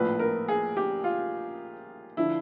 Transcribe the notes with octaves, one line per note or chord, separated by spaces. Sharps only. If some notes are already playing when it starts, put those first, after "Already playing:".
Already playing: A#1 A2 F3 B4
A#4
G#4
G4
F4
D3 F3 E4